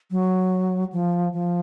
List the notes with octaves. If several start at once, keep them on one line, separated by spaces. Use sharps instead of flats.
F#3
F3
F3